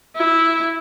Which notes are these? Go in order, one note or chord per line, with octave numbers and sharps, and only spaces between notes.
E4